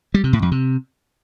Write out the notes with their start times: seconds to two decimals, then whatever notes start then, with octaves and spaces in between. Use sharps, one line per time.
0.14 G3
0.24 C3
0.33 A2
0.42 F2
0.52 C3